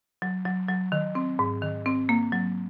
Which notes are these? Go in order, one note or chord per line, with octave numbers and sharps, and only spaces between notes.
F#3
F#3
F#3
D#3
C4
G#2
D#3
C4
A#3
F#3